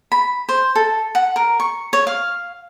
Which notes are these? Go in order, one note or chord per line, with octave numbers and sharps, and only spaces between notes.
B5
C5
A4
F#5
A#4
C#6
C#5
F5